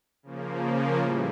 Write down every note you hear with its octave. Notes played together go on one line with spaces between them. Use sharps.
C#3 F3 A#3
A2 E3 G3